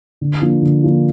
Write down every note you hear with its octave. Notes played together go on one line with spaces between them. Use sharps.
D3
F3 A#3 D4 F4
D3
F3 A#3 D4 F4